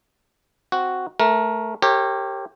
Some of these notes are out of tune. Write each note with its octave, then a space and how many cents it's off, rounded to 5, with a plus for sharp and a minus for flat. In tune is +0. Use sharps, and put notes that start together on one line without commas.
C4 +0 F#4 +0
A3 +0 A#4 +15
G4 +0 A#4 -30 C#5 -35